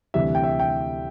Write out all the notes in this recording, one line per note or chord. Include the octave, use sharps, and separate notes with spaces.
D2 C3 E3 G3 E5
G5
E5
G5